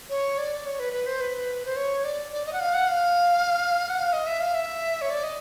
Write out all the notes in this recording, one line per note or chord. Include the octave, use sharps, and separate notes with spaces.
C#5
D5
C#5
B4
B4
C5
B4
C5
C#5
D5
D5
D#5
F#5
F5
F#5
F5
F#5
F5
D#5
E5
F5
E5
C#5
D5
D#5